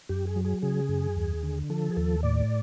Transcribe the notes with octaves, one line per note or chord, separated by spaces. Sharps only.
F#2 G4
G#4
F#3
G#4
C#3 G#4
F#2
D#2
D3
F3 A4
G#4
D#2 A4
A2 D5